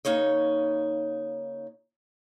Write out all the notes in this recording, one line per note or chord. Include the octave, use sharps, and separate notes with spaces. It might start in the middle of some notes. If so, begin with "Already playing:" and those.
C#3 F#3 A#3 D#4 C#5 D#5